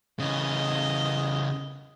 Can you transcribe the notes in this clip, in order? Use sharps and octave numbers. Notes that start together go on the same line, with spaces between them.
C#3 E3 D#5